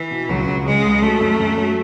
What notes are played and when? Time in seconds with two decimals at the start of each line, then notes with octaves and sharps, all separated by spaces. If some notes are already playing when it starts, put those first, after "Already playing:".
Already playing: E3
0.11 B2
0.29 C#2 F#3
0.47 C#2
0.66 C#3 G#3
0.84 C#2
1.02 F#3 A3
1.21 F#2
1.40 F#2
1.58 F#3